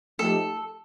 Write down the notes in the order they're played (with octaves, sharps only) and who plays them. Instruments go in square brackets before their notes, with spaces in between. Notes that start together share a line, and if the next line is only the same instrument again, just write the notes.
[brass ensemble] F3 A3 D#4 G4 [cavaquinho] A4